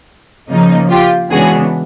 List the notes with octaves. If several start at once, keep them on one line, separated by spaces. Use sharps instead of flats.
C#3 F3 A#3 D#4
F4 G4
C#3 E3 G#3 B3 D4 F#4 G#4